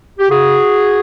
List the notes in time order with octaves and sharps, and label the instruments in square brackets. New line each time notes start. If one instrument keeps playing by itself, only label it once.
[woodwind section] G4
C#3 F#4 G#4